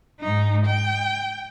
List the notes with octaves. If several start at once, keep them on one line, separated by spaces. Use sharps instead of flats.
G#2 D#4
G5